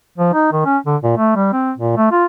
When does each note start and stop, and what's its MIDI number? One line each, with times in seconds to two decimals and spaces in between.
0.18 0.32 53
0.34 0.52 63
0.53 0.63 51
0.65 0.78 61
0.86 0.97 50
1.03 1.12 46
1.17 1.36 57
1.36 1.50 55
1.53 1.72 60
1.78 1.96 46
1.97 2.11 57
2.12 2.25 65